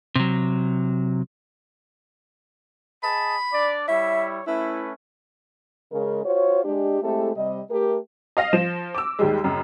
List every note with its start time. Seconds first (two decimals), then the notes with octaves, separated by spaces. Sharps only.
0.15 C3 F#3
3.03 G#4 D#5 A5 B5
3.53 D4 D5
3.89 G3 E4 C#5 E5
4.47 A3 C#4 E4 B4
5.92 C#3 G#3 A#4
6.24 F4 F#4 C5 C#5
6.64 G#3 D4 G4
7.02 G#3 A3 C4 E4 G4 A4
7.36 C3 G3 D#5
7.70 A3 G4 A#4
8.37 D#5 F5 A#6
8.53 F3 E7
8.95 D6 E6
9.19 D#2 G3 G#3
9.44 F#1 F#2